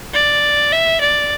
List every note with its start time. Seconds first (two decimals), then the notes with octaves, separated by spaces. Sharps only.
0.13 D5
0.72 E5
1.01 D5